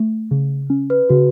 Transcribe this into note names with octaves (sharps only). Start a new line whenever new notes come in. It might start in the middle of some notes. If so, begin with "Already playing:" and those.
Already playing: A3
C#3
C#4
B4
C#3 F#4